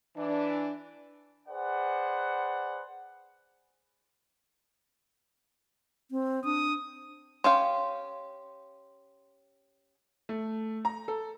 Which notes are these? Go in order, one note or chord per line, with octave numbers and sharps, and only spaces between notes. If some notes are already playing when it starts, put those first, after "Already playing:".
E3 D4
G#4 B4 C5 D5 F#5
C4
D4 D#6
C#4 G4 F5 C6
A3
A#5
A4